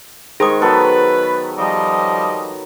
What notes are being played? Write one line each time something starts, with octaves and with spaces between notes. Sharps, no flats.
D#3 G#3 G#4 C5 C#6 D#6
F#3 B3 A4 B4
F3 G3 D#5